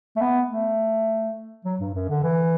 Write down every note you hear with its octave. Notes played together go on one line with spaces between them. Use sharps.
A3
B3
A3
F#3
G2
F#2
D3
E3